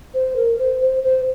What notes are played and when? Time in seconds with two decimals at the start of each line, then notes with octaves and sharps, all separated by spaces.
0.14 C5
0.36 A#4
0.59 C5
0.81 C5
1.03 C5